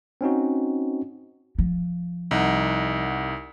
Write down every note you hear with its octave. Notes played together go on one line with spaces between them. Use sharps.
C4 C#4 D#4 F#4
F3
C2 D#4 F#5